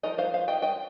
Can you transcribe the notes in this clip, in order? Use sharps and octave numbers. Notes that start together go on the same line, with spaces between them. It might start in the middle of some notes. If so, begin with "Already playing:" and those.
F3 D#4 A#4 D#5
C5 F5
C5 F5
D#5 G5
D#5 G5